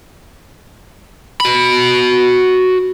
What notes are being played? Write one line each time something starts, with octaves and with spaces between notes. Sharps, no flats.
F#4 B5